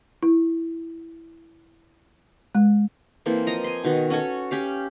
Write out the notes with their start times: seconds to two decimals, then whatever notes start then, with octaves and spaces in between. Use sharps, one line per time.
0.23 E4
2.55 G#3
3.26 E3 A#3 C4 A4
3.46 F3 D#5 A#5
3.64 G#5 C6
3.84 B2 D#3 F#4
4.10 C#4 F#4 A4 C#5
4.51 C#4 G4 F5